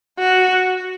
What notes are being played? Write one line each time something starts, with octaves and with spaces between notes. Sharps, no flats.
F#4